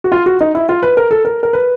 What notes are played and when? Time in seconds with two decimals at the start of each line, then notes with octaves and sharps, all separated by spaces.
0.04 F#4
0.12 F4
0.26 F#4
0.41 D#4
0.55 E4
0.69 F4
0.83 B4
0.97 A#4
1.11 A4
1.25 A#4
1.43 A#4
1.53 B4